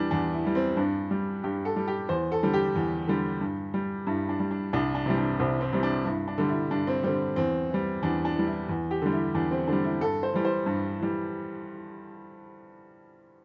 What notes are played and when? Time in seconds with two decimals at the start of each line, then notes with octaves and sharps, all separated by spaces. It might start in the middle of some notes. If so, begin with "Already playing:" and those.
Already playing: E2 E3 G3 D4 E4
0.11 E2 D4
0.33 E4
0.44 E3 G3
0.55 C4
0.77 G2 D4
1.11 G3
1.44 G2 G4
1.65 A4
1.76 G3
1.88 G4
2.09 E2 C5
2.32 A4
2.43 D3 G3
2.54 G4
2.75 E2
3.08 D3 G3
3.41 G2
3.74 G3
4.07 G2 E4
4.29 D4
4.40 G3
4.51 D4
4.73 C2 D4
4.95 D4
5.06 C3 E3 G3
5.18 D4
5.39 C2 C4
5.61 C4
5.72 C3 E3 G3
5.83 D4
6.05 G2 E4
6.28 D4
6.38 D3 G3
6.49 E4
6.71 G2 D4
6.87 C4
7.03 D3 G3 C4
7.36 E2 C4
7.70 E3 G3
8.03 E2 D4
8.25 D4
8.36 E3 G3
8.47 E4
8.69 E2
8.91 G4
9.02 D3 G3
9.12 E4
9.34 E2 D4
9.51 C4
9.68 D3 G3 D4
9.84 E4
10.01 G2 A4
10.23 C5
10.33 E3 G3
10.45 C5
10.66 G2
11.00 E3 G3